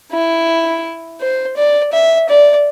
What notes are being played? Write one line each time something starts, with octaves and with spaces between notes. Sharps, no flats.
E4
C5
D5
E5
D5